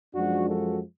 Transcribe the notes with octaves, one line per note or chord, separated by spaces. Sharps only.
F#2 F3 G#3 D4 F#4
F#4 A4